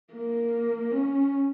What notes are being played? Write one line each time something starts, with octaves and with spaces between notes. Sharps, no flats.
A#3
C#4